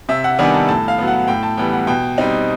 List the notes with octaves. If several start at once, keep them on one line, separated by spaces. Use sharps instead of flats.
C3 E5
F#5
D#3 G3 B3 D4 G#5
A5
A2 A5
F5
F#3 B3
F#5
A2 G5
A5
E3 G3 B3 G5
F#5
B2 G5
G3 C4 D#4